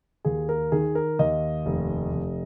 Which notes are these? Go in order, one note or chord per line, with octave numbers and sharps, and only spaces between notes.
D#2 G#4
A#4
D#3 G#4
A#4
D#2 D#5
F1
F1